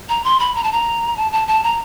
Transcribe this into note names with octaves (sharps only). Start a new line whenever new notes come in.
A#5
C6
B5
A#5
A5
A#5
A5
A5
A5
A#5